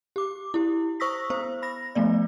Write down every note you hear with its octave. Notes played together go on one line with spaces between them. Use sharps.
G4 D6
E4 G4
C5 C#6 D#6 E6 A#6 B6
B3 C5
B5 A#6
F3 A3 B3 D5